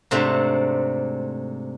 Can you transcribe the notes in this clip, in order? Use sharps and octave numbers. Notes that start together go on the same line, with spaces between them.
G#2 C3 A3 C4 D4